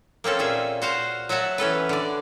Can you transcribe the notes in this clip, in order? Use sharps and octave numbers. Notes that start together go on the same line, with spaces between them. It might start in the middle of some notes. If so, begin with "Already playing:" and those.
A#3 C4 C#4 A4
A#2 G#4 E5
F#4 C5 F5 F#5
F#3 F#4 E5 F#5 A5
E3 C#4 A4 B4
D3 D5